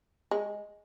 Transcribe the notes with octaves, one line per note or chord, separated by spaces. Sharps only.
G#3